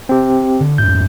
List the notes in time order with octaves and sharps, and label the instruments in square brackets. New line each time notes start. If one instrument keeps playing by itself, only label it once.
[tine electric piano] C4 G4
[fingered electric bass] D3
[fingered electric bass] F2 G#2 [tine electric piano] G6